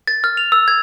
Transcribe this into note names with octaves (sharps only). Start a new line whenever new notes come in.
A6
F6
F7
E6
G#6